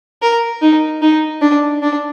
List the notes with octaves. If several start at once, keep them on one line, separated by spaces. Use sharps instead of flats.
A#4
D#4
D#4
D4
D4